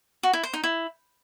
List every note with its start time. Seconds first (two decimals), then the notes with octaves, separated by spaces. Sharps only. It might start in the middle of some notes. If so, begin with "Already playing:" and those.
0.23 F#4
0.33 E4
0.43 C5
0.54 D#4
0.64 E4